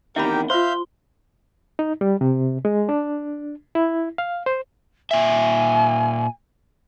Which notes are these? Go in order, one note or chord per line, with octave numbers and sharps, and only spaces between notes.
E2 C3 D#3 G4 A#4 E5 G5 B5
F4 C5 E5 F5 C6 G6
D#4
G3
C3
G#3
D4
E4
F5
C5
A#2 E5 G#5